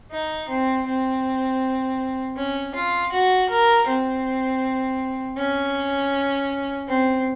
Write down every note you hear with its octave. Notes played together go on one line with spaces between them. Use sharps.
D#4
C4
C4
C#4
F4
F#4
A#4
C4
C#4
C4